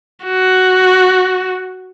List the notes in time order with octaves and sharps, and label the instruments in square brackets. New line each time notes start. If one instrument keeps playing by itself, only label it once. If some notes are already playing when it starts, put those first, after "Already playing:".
[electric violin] F#4